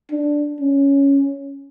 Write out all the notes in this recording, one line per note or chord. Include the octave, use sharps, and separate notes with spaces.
D4
C#4